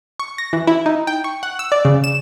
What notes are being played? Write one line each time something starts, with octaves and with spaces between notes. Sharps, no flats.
C#6
A#6
E3
E4
D#4
G5
C#6
F#5
E6
D5
C#3
E7